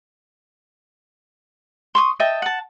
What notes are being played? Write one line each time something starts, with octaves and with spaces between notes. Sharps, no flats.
C6 C#6 D#6
D#5 E5 G5 A5
F#5 A5